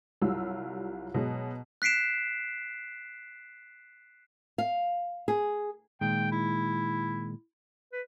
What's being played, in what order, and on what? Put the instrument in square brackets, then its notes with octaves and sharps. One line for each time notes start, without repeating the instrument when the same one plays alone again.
[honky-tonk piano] C2 F#3 G3 F4 E6
B2 F#3 G#3
[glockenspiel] F#6 B6 C7 D7 E7
[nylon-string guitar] F5
G#4
[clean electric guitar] A#2 D#3 G#3 [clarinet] G5
[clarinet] E4
B4